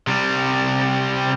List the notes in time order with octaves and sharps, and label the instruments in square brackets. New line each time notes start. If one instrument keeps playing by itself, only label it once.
[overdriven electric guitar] C3 G3